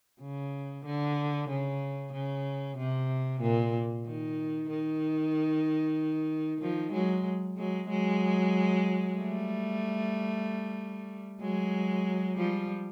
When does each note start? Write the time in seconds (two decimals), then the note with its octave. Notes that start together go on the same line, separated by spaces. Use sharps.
0.22 C#3
0.86 D3
1.50 C#3
2.14 C#3
2.78 C3
3.42 A#2
4.06 D#3
4.70 D#3
6.61 D#3 F3
6.93 F#3 G#3
7.57 F#3 G#3
7.89 F#3 G#3
9.17 G3 A3
11.41 F#3 G#3
12.37 F3 G3